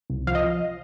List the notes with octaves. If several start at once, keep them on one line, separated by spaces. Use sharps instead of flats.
C2
F3 F5
D#5